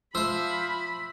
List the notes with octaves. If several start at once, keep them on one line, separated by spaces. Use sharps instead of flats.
F3 C5 E5 B5 E6